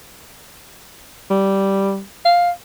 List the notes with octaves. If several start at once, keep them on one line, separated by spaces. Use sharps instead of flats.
G3
F5